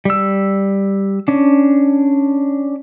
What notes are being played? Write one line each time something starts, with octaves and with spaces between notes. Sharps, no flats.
G3 E6
C#4 D4